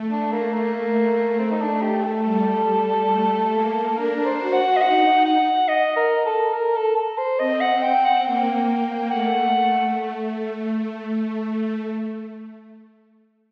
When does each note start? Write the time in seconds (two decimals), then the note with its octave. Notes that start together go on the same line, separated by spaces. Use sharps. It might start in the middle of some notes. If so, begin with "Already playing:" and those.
Already playing: A3
0.10 D4
0.32 A#3
0.53 A#3
1.39 C4
1.51 D#4
1.61 D4
1.82 G4
2.03 A4
2.25 G3
2.68 G3
3.10 A3
3.53 A#3
3.96 D4 A#4
4.25 C5
4.39 F#4
4.53 F#5
4.76 D#5
4.81 D#4 F#5
5.25 F#5
5.68 D#5
5.96 A#4
6.26 A4
6.53 A#4
6.76 A4
6.96 A4
7.18 C5
7.39 C4 D#5
7.60 F#5
7.82 G5
8.04 F#5
8.26 A#3 G5
9.10 A3 F#5
9.54 A3